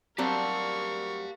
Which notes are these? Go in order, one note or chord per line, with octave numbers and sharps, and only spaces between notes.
F#3 G3 C4 D4 G4 A#4 F5 C#6